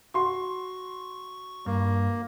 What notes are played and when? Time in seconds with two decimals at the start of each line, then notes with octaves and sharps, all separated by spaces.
0.14 F#4 C6 C#6
1.66 G2 A#3